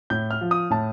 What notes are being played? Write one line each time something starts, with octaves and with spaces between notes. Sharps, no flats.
A2 G6
F6
F3
D#6
A2 A5